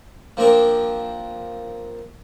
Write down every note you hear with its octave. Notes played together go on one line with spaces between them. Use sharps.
F3 A#3 C4 D4 A#4